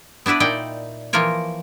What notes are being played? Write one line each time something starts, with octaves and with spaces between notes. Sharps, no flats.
B3 D4 E4 B4 D5
A#2 D#4 E4 D5 G5
E3 F3 A#3 F4 A#4 C#5